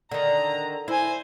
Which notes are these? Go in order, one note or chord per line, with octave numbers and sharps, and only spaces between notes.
D3 D#3 A#5
E4 C5 G#5